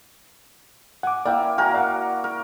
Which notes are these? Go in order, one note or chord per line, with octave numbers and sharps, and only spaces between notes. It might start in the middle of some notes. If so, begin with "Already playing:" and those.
F#5 G#5 D6
A#3 E4 D5 G5
F#4 A#4 G5 G#5 A#5
D5 F5 F#5
A#4